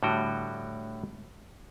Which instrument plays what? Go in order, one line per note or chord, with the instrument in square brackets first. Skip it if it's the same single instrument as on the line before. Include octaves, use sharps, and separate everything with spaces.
[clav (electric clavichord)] A2 D3 G3 F#4 G5